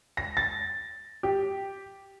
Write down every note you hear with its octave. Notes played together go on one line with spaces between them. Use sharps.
A#6
A6
G4